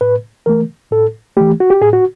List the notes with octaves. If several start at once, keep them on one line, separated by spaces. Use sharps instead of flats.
A2 B4
E3 A3 A#4
A2 A4
E3 A3 G4
F#4
G4
A2 G#4
F#4